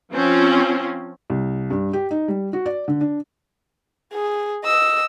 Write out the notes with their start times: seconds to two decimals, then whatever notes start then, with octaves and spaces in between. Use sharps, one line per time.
0.12 F3 C4 C#4 F4
1.30 C2
1.70 G2
1.93 G4
2.11 D#4
2.28 G3
2.53 F#4
2.66 D5
2.88 D3
3.01 D4
4.13 G#4
4.64 D#5 E6